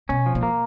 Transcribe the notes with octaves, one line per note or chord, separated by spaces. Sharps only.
B2 C#4
F3
A#2
A#3